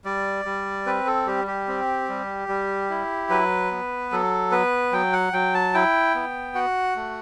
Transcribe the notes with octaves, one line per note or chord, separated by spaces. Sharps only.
G3 D5
G3
C4 B4
A4
G3 G4
G4
C4
G3
G3
E4
F#3 B4
B3
F#3 A4
B3 B4
F#3 G5
F#5
F#3 G5
A5
E4 G5
B3
F#4 F#5
A3